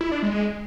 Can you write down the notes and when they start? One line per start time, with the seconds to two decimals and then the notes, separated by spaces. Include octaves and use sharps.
0.01 E4
0.11 D4
0.22 G#3